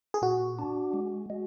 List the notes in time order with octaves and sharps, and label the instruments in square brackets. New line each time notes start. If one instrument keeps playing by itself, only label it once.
[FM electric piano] G#4
[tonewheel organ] A#2 [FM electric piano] F#4
[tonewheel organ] D4
G#3
G#3